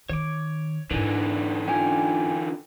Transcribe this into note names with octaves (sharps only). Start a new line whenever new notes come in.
D#3 C#5 D6
G#2 D3 E3 A#3 D4 B4
C#4 D4 F4 G5 G#5